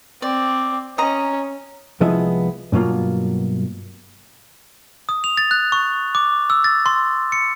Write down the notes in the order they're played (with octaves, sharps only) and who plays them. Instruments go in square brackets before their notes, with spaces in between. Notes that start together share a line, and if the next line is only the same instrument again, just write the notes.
[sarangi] C4 [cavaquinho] D5
[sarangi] C#4 [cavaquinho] D#5 A#5
[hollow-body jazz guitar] C2 F3 G#3 B3 E4 E5
G2 B2 F#3 A#3 F4
[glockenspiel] D#6
F7
A6
F#6
C#6
D6
E6
A6
C6
C#7